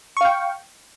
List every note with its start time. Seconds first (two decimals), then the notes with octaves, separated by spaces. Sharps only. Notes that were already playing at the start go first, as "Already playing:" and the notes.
0.17 C#6
0.21 F5
0.25 G5